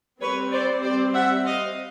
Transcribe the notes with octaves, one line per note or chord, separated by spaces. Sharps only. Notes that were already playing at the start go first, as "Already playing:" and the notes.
G3 C4 B4 C#5
C5 D5
C5 D5
E5 F#5
D#5 F5